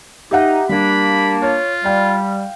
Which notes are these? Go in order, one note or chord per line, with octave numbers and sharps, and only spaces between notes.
D#4 G4 E5 F#5
G3 A#3 D4 B5
F4 C#5
G3 F5 G5